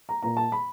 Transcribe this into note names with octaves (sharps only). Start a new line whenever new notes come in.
A#5
A#2 A#5
A5
B5